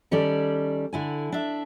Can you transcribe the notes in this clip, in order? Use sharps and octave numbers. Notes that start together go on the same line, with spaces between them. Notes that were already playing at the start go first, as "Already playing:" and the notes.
D#3 G3 C#4 A4 D5
D3 E4 G#5
D4 E5